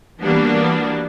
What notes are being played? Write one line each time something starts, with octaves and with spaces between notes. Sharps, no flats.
E3 G3 A#3 B3 D4 F#4